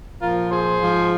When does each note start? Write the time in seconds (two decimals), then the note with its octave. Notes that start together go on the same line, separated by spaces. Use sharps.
0.21 A#2 F3 F4 A#4
0.50 G#4 C5
0.79 G#2 F3